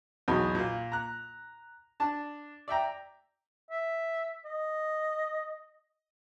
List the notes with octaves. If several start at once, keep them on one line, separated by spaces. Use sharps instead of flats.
B1 E2 F#3 B3 D#4 D#5
A#2 F4
A#5 F#6
D4 A5
D5 E5 G5 A#5
E5
D#5